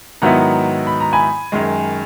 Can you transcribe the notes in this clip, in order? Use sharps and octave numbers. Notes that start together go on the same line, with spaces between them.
G#2 D#3 F#3 B3 E4 F#5 A#5
B5
A#5
G#5 B5
F#2 D#3 G#3